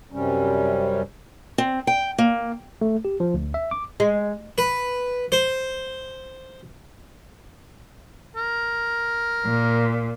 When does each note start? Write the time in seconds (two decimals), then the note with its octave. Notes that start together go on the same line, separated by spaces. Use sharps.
0.12 F#2 C3 G3 C#4
1.58 C4
1.87 G5
2.18 A#3
2.81 A3
3.05 G4
3.20 F3
3.34 D2
3.54 E5
3.71 D6
4.00 G#3
4.58 B4
5.32 C5
8.36 A#4
9.45 A#2